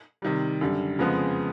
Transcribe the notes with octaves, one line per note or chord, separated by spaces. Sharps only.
C3 D#3 G3
F#2 D3 G3
F2 C#3 F3 G#3 B3